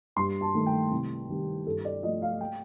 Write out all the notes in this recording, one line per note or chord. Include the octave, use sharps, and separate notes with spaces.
G2 C6
A5
D#3 A3
G5
C2
C3 D#3 G3
G2 A4
D5
F3 A3 D#5
F5
G5